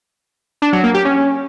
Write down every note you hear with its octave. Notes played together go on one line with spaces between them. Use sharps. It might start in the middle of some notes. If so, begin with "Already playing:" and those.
D4
F#3
A#3
G4
C#4